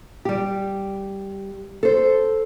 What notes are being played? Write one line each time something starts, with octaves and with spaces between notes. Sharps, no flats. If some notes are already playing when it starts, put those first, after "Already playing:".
G3 G4
A4 C5